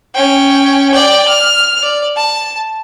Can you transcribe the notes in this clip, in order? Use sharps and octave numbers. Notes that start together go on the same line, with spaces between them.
C#4 G5
D5 G5
F6
D5
A5